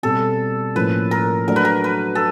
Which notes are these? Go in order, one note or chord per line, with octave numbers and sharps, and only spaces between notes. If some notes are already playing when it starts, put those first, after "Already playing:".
B2 G3 C4 A4
A2 F3 A#3 C#4 B4
A#4
F#3 A3 D4 F#4 A#4
B4
A#4
B4
A4